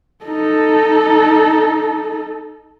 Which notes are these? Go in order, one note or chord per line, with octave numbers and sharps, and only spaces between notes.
D#4 A4